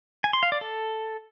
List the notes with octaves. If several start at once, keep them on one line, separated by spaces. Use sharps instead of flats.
G#5
C6
F5
D5
A4